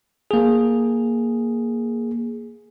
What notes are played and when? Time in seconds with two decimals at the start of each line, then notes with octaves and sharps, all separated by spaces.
0.31 A#3 G#4